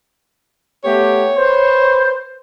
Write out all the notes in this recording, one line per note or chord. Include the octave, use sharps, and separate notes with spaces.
A3 B3 G4 C#5
B4 C5